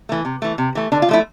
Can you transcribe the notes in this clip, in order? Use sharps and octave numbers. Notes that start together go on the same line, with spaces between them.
E3 A3
C3
E3 A3
C3
E3 A3
D3 D4
F4
F3 A3 E4